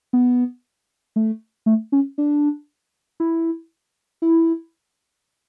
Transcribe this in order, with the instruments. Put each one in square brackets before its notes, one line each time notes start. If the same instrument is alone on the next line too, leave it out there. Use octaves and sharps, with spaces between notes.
[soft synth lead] B3
A3
A3
C#4
D4
E4
E4